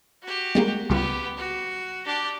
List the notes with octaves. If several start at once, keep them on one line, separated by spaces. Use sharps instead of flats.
F#4 G4
G3 G#3 A#3
C#2 G3 B3 F4 G4
F#4
D4 G4